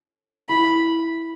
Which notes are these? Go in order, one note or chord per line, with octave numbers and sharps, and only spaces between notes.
E4 B5